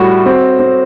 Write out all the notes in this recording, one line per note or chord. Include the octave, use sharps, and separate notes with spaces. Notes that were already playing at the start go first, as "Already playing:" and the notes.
Already playing: A2 G3 F#4
C4
C4